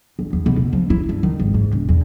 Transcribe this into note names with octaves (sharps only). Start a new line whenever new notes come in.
G1
E2
B2
F#1
F3
E4
G2
D#3
G#1
G#2
E1
E2